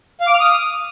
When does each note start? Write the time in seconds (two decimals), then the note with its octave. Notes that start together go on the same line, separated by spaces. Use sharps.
0.20 F5
0.27 D6
0.34 F6
0.40 D#6